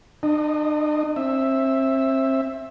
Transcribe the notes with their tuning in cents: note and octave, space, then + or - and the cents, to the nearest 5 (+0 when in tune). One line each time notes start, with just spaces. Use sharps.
D4 +45 D#5 +0
C4 +35 E5 +0